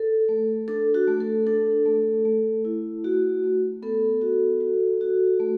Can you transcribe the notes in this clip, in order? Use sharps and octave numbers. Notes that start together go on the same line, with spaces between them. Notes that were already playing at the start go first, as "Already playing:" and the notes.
Already playing: A4
A3
D4 A4
F#4
A3
A4
D4 A4
A3
A3
E4
A3 F#4
A3
B3 A4
F#4
F#4
F#4
A3